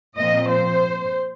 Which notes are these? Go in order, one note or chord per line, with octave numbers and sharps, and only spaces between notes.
A#2 F3 C4 D#5
C5